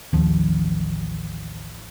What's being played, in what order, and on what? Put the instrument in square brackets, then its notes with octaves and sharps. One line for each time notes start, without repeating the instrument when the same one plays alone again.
[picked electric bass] A1 F3 [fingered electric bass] D#2